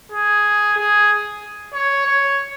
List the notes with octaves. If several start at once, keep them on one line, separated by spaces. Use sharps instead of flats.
G#4
G#4
C#5
C#5